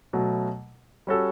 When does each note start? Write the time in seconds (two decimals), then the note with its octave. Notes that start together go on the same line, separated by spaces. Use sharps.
0.13 B2 F#3 A3
1.07 G3 C#4 F#4 A4